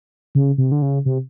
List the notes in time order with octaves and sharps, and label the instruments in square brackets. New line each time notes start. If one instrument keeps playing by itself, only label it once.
[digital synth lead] C#3
C3
D3
C#3
C3